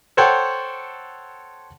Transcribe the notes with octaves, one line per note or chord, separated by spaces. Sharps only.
A4 C5 C#5 F#5 G5 A5